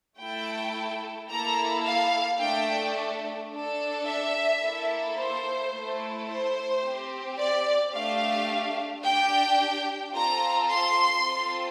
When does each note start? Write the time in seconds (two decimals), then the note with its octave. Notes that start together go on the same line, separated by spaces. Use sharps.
0.19 A3 E4 A4 G5
1.30 A#3 E4 A4 A#5
1.85 F5
2.40 A3 D4 A4 G5
3.51 D4 A4
4.06 E5
4.62 A#3 E4 A4
5.16 C5
5.71 A3 E4 A4
6.27 C5
6.83 C4 G4
7.38 D5
7.93 A3 D4 G4 F5
9.03 D4 G4 G5
10.14 C4 F4 A4 A#5
10.70 C6
11.24 C4 F4 A4